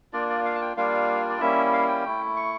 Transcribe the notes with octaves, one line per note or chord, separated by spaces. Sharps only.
A#3 D4 F4 D5
D5
F5
A5
G5
G3 A#3 D4 F4 F5
D5
G3 A#3 C#4 E4 E5
F5
G5
A3 E4
C#6